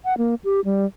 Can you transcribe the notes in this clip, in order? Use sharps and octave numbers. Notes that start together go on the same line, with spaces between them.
F#5
A#3
G4
G3